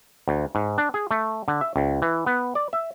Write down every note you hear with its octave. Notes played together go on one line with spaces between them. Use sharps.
D2
G#2
D4
G#4
A3
D3
E5
C#2
E3
B3
D5
E5